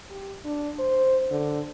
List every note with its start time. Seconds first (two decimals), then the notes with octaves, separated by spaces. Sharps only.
0.10 G4
0.44 D4
0.79 C5
1.31 D3